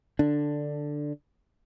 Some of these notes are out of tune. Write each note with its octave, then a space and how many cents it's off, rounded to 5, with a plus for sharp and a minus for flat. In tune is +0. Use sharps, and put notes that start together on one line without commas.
D3 +5 D4 +0